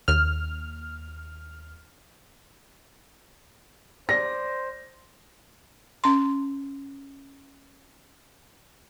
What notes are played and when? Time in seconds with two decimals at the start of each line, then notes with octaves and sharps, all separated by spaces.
0.08 D#2 F6
4.09 C5 D5 A#6
6.04 C#4 C6